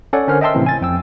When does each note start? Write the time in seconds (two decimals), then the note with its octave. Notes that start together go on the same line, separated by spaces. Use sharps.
0.13 C#4 A4 C#5 D5 F#5
0.28 D3 C#4 A#4 C5 F6
0.41 D#5 E5 G5 A5 C6 E6
0.54 A2 C3 E3 C4
0.66 G#5 A6
0.81 F2 G5 E6